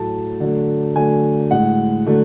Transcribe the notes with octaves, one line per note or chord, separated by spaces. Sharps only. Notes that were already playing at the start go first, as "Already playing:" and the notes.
Already playing: A2 F#3 A3 A5
D3 F#3 A3
D3 F#3 A3 G#5
A2 G#3 F#5
D3 F#3 A3